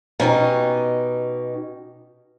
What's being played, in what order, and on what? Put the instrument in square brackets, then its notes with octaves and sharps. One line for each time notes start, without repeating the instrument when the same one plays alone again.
[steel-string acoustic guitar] B2 C#4 D#4 G4